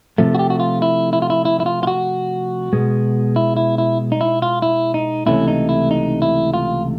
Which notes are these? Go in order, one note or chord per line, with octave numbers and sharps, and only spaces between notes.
C3 F3 A3
F#4
G4
F#4
F4
E4
E4
F4
E4
E4
E4
F4
F4
F#4
B2 G#3 B3
E4
E4
E4
D#4
E4
F4
E4
D#4
C#2 C3 E3 A3 C#4 E4
D#4
E4
D#4
E4
F4